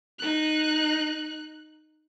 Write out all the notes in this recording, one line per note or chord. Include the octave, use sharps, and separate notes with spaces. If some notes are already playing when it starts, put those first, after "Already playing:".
D#4 F#6